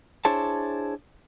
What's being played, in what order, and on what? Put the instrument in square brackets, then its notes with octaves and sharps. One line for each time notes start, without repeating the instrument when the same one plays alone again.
[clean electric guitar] D4 E4 G#4 C5 C#5 A5